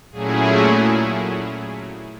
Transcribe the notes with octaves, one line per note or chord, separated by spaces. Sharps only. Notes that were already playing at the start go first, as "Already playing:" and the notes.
A#2 F#3 A3 C#4 E4 G#4